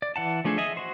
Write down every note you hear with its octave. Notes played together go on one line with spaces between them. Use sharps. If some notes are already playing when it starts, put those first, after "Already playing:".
D5
E3 F#5 A5
F3 A3 D4 G#4 A4
G#4 D#5 E5
F#4 C5